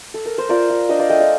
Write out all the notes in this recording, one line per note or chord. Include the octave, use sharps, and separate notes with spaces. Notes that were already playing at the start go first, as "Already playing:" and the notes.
A4
A#4
C5
F4 A#4 D5
F4
D4 C5 D#5
D5 F5
A3 D#5 G5
D5 F5